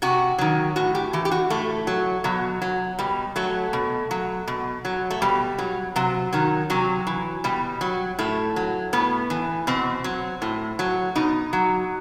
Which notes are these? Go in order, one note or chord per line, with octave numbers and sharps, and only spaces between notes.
C3 F#4
D#3 F#3
A2 F#4
G4
E3 G4
G4
F#4
A2 A3
F#3
B2 F#3
F#3
B2 G3
F#3 A3
B2
F#3
B2
F#3
A3
B2 G3
F#3
C3 F#3
D#3 F#3
C3 F#3
E3
B2 G3
F#3
A2 A3
F#3
A2 B3
E3
B2 C4
F#3
A2
F#3
B2 D#4
F#3